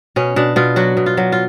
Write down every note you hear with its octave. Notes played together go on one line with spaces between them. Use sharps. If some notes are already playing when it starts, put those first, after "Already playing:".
B2 C#4
B2 D4
B2 F4
F#3 F#4
B2
F4
F#3
F4